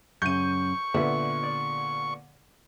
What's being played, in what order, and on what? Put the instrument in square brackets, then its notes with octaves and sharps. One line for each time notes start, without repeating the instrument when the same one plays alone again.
[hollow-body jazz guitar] F#2 C#3 [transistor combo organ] C#6 [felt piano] G6 D#7
[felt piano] A#2 D3 B3 [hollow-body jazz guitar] E5
[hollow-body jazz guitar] D5